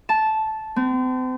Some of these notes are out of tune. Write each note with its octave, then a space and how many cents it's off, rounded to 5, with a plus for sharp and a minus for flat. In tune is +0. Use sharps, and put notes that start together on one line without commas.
A5 -10
C4 -40